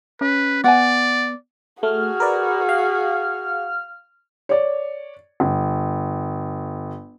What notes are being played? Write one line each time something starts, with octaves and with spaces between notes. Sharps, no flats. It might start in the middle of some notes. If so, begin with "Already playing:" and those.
C#4 B4
B3 D5 F#5 G#5
A3 F#4 G#4 F6
A#4 B4 D5
F5
C#5 D5
G1